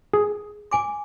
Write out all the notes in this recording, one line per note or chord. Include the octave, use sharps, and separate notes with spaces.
G#4
G#5 D6